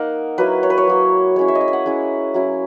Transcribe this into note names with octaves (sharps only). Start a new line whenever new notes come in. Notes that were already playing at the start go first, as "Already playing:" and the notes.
Already playing: A#3 D#4 A#4 F#5
F#3 A#3 E4 B4
C#5
B4
C#5
F#3 A#3 E4
G#3 C#4 E4 C#5
E5
D#5
E5
G#5
F#5
G#3 C#4 E4
F#3 C#4 E4